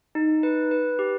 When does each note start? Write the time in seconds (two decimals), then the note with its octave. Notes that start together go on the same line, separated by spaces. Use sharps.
0.15 D#4
0.43 B4
0.71 B4
0.99 G4